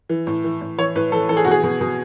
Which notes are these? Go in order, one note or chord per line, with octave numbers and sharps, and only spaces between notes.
E3
A2
E3
A2
E3 C#5
A2 B4
E3 A4
E3 A4
G#4
B2 F#4
G#4
B2
B2